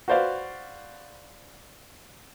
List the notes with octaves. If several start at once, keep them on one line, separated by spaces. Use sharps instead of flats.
F#4 B4 C5 D5 F5